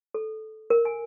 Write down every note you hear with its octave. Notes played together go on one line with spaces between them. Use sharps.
A4
A#4
G#5